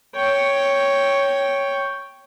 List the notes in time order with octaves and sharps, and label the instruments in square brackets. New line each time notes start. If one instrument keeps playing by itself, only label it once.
[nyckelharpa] C#5 G5